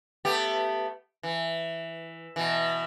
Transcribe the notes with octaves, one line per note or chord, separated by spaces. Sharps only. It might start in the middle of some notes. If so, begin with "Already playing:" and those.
A3 B3 G4
E3
B2 E3